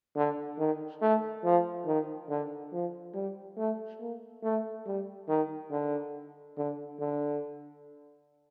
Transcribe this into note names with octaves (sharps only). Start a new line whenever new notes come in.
D3
D#3
A3
F3
D#3
D3
F3
G3
A3
A#3
A3
G3
D#3
D3
D3
D3